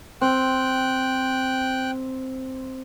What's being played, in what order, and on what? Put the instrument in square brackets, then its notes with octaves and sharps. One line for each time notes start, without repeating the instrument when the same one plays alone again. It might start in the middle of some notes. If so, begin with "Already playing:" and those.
[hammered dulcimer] C4 [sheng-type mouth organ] G5 F#6